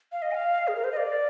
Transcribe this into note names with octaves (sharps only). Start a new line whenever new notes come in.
F5
D#5
G#5
F5
G#4
A#4
C5
D#5
D5